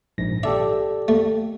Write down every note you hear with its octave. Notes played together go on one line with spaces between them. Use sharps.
A#1 G#2 A#6
G4 A4 D5 E5
A3